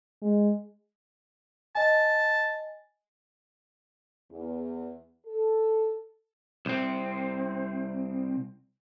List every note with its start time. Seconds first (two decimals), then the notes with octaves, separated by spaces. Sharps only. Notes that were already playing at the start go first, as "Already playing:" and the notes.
0.22 G#3
1.75 D#5 G#5 A5
4.31 E2
5.27 A4
6.66 C2 C4